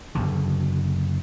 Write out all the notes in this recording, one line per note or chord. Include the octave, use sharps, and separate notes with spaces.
F#1 B1 D3